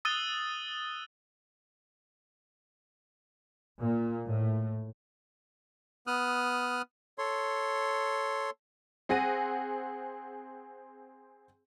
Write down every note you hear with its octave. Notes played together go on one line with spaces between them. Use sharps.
D#6 E6 F#6 A6 D#7 G7
A#2
A2
B3 D#6 F6 F#6
A4 C#5 C6
C4 G#4 F#5 A#6 D#7